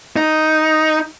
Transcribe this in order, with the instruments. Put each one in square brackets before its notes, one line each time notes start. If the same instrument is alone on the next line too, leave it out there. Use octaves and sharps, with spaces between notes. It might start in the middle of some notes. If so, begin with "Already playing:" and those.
[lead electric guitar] D#4